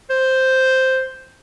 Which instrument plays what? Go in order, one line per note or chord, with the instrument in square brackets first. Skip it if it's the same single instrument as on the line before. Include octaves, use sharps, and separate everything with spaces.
[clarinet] C5